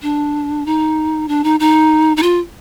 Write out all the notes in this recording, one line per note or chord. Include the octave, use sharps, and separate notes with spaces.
D4
D#4
D4
D#4
D#4
D#4
F4